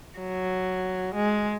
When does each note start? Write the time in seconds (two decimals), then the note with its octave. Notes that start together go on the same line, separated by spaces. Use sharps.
0.19 F#3
1.14 G#3